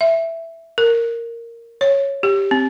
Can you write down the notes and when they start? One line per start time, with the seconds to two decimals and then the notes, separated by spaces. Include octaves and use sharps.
0.01 E5
0.78 A#4
1.81 C#5
2.23 G4
2.51 C4